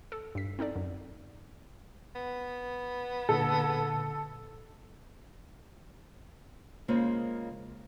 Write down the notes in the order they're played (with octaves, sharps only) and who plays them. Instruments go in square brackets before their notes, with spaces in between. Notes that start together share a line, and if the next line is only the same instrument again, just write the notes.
[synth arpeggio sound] A4
G2 B6
C4 D#4 A4 D5
F#2
[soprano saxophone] B3
[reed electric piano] A#2 D3 [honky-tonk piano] A4
[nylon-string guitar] C#3 G#3 A#3 F4 G#4 C5